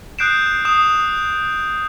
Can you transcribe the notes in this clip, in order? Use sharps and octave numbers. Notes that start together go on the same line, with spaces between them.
D#6 F#6 G6 C7 D7 E7
D#6 E7